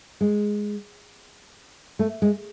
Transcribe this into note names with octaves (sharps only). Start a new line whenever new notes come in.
G#3
A3
G#3